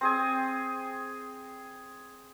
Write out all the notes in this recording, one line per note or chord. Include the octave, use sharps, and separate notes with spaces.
C4 G#4 G#5